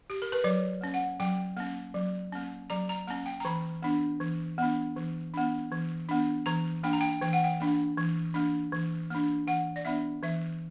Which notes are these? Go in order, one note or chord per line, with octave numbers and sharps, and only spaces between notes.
G4
A#4
B4
F#3 C#5
A#3 C#4
F#5
F#3 G5
A#3 C#4
F#3
A#3 C#4
F#3 A#5
A#5
A#3 C#4 A#5
G5
A#5
E3 B5
B3 D4
E3
B3 D4
E3
B3 D4
E3
B3 D4
E3 A#5
A#3 D4 G5
A#5
G5
E3 G5
F#5
G5
A#3 D4
E3
A#3 D4
E3
A#3 D4
E3 F#5
D5
B3 D4 E5
E3 E5